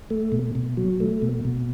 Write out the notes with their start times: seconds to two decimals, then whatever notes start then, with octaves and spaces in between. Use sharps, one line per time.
0.10 A3
0.32 B2
0.55 B2
0.77 F#3
1.00 A3
1.22 B2
1.45 B2